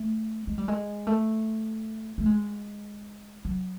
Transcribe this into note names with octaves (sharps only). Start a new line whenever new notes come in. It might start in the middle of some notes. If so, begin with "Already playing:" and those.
Already playing: A3
G#3
G3
G#3
A3
A3
G#3
F#3